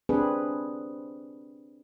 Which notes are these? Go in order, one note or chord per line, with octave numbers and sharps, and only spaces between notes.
C4 D4 G#4 B4